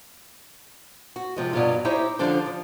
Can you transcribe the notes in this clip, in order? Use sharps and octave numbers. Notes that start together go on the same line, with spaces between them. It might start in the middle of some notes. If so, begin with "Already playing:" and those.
F#4
C3 F3 G#3
G2 B2 F#3 F4
D#4 E4 G4 C5 C#5
D3 F3 G3 D4 C5
F3